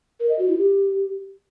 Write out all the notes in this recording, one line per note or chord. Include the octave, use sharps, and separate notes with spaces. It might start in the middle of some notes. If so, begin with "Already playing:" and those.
A#4
D#5
F#4
E4
G4